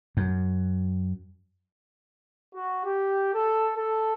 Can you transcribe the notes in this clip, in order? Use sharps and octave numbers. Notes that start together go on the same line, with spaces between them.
F#2
F#4
G4
A4
A4